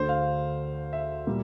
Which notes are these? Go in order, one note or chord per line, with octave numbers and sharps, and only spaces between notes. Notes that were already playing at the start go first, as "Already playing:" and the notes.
Already playing: D2 D3 A3 C5
F5
E5
A#2 G3 A#3